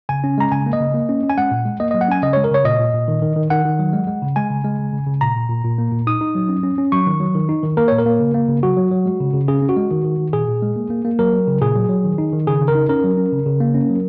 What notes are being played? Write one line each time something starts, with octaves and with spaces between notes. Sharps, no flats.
C#3 G#5
C#4
G#3 A#5
C#3 G#5
A#3
D#5
C#3
A#3
C#4
C#4
G#5
G#3 F#5
A#2
G#3
A#3 D#5
F#3 D#5
F#5
C#4 G#5
C#3 D#5
G#3 C#5
A#4
C#3 C#5
A#2 D#5
A#2
A#2
D#3
D#3
D#3
D#3 F#5
D#3
F#3
G#3
G#3
C#3
G#3 G#5
C#3
G#3
C#3
C#3
C#3
A#2 A#5
A#2
A#2
A#2
A#3
A#2
D#4 D#6
D#4
F#3
C#4
C#4
C#4
F#3 C#6
D#3
F#3
D#3
D#4
D#3
A#3 A#4
A#2 C#5
A#4
A#3
C#3
A#3
C#3
F#3 F#4
F#3
F#3
G#3
C#3
C#3
C#4 G#4
C#4
F#4
G#3
D#3
D#3
D#3
A#2 G#4
A#2
G#3
A#3
A#3
A#3
F#3 A#4
F#3
C#3
A#2 G#4
F#3
F#3
D#3
D#4
D#3
C#3 G#4
C#3
A#4
D#4
C#4 A#4
F#3
C#4
C#3
C#3
A#3
C#4
F#3